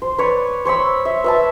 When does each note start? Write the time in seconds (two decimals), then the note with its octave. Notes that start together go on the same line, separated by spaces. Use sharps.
0.02 C5
0.18 B4 C#5 D5
0.65 C5 C#5 B5 E6
1.05 E5
1.24 B4 E5 A5